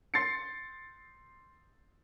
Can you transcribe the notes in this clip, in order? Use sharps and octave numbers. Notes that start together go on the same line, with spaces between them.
C6 A6 C7 C#7